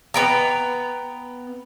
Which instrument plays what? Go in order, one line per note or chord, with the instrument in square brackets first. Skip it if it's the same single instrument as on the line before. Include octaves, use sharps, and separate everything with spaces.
[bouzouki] B3 G5 A#5